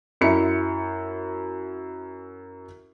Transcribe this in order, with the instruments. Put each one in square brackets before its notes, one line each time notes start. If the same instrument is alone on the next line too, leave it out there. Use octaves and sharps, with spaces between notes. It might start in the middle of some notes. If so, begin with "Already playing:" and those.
[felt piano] F#2 E4 C#7